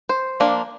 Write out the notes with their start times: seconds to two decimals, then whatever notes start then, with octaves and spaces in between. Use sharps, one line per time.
0.09 C5
0.40 F3 A#3 D4